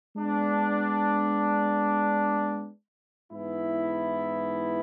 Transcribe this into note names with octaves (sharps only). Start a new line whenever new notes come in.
G#3 B3 D4
G#2 E3 B3 E4